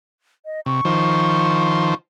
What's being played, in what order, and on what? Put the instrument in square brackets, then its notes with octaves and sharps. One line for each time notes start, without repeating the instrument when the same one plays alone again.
[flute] D#5
[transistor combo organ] C3 [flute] C#6
[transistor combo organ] D#3 F3 C5